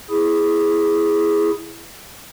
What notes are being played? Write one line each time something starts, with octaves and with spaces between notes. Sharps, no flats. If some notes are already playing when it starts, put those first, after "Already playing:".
E4 G#4